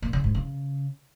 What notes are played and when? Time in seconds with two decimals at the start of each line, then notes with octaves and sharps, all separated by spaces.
0.02 A#2
0.13 C#3
0.24 G#2
0.35 C#3